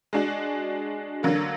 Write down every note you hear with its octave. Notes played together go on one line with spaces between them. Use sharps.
G#3 D4 F#4
D3 F#3 A#3